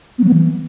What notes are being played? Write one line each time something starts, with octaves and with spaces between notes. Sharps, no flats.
B3
F#3
B3
E3